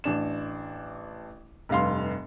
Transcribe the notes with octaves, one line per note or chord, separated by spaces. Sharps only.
A1 D4 E7
F1 G2 F5 C6